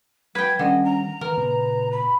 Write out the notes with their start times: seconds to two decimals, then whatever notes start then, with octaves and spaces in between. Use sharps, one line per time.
0.35 F#3 B4 G5 G#6
0.59 D3 D#3 G3 C#4 D#5
0.84 A#5
1.21 D#3 A#4 B4
1.37 A#2 C#3
1.92 B5